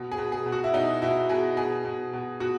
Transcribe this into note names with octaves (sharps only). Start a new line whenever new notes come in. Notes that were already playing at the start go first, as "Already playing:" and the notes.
Already playing: B2
G#4
B2
G#4
B2
F#4
E4
B2 D#4
B2 E4
B2 G#4
B2 G#4
B2
B2
B2 F#4